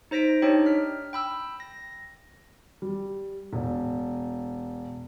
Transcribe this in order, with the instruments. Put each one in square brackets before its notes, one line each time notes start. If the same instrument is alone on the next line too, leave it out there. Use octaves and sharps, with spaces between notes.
[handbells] D#4 C5 A#6 B6 D7
D4 D#4 G4 C#5 G5
F6 B6
G5 B5 E6
A#6
[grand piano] G3
E1